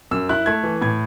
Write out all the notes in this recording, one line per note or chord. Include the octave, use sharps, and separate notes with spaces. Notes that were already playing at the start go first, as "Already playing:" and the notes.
F#2 E6
E4 F#6
A3 G#6
E3
A2 G#6